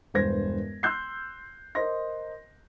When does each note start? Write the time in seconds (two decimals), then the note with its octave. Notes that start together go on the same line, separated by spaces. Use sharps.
0.14 E1 G2 B4 C5 G#6 A#6
0.83 C6 E6 F#6 G6 C7
1.75 A#4 C5 D#5 C6 A#6